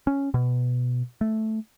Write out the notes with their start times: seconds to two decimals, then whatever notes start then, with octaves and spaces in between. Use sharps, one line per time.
0.07 C#4
0.34 B2
1.21 A3